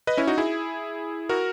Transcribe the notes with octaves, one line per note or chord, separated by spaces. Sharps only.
B4 D#5
C#4 E4
D#4 F#4
E4 G#4
F#4 A#4